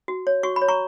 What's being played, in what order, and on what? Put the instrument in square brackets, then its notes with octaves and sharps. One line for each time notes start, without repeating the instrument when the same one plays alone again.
[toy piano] F#4
C#5
F#4 C#6
B5
C#5
A#5 C#6